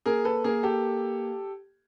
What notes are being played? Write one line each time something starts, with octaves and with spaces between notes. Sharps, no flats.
A#3 G#4 A#4
A4 B4
A#3 G#4 A#4
G4 A4